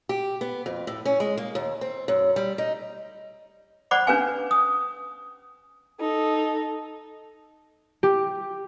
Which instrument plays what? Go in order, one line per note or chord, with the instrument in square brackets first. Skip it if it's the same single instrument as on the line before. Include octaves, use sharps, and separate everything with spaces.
[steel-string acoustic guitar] G4
B3
F2
A2
C#4
G#3
A#3
D#2
C4
F#2
G3
D#4
[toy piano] C5 D5 F#5 B5 D6
C#4 D4 B4 F5 G#5
D#6
[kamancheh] D#4 A4
[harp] G4